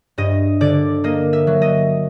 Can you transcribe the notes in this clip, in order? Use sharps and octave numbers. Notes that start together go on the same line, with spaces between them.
G2 D#5
D3 D5
A#3 D#5
E5
F#3
D#5